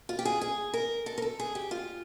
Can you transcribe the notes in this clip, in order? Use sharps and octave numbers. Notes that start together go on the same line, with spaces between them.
F4
G4
G#4
G#4
A#4
A4
A#4
A4
G#4
G4
F4